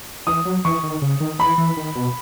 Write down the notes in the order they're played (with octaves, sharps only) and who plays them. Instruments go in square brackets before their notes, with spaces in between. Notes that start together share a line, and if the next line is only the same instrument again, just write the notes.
[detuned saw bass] E3 [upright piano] D#6
[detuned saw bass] F#3
[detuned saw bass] E3 [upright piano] C#6
[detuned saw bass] D#3
C#3
D#3
[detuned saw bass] E3 [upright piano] B5
[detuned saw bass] E3
D#3
B2